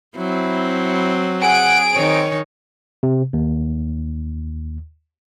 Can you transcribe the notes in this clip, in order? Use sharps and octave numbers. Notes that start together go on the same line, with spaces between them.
F#3 C4 E4
G#4 F#5 D7
D#3 C4 D#4 C#5
C3
D#2